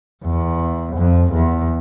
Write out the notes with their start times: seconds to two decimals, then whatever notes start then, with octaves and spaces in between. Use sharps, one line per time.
0.24 E2
0.97 F2
1.33 E2